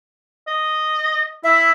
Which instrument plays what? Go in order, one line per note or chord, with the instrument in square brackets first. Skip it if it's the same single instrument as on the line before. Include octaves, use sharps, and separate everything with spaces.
[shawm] D#5
[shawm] E4 [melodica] E5